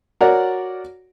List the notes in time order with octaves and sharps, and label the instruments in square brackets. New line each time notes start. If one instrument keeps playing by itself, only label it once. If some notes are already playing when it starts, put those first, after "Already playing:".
[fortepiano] F#4 A#4 C#5 D5 F#5